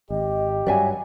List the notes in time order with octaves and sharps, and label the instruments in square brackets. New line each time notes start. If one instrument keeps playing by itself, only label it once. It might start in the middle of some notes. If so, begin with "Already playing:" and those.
[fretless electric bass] G#1 [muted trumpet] G4 [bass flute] D#5
[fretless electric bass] G2 F#3 [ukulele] D5 E5 G#5 [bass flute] F#5